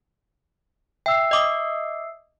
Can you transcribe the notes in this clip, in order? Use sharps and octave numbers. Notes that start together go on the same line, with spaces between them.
E5 G5 E6 C7
D#5 D6 D#6